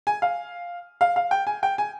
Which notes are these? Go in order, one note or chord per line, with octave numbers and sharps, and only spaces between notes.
G#5
F5
F5
F5
G5
G#5
G5
G#5